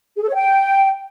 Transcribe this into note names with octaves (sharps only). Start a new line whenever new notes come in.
G#4
A4
C#5
G5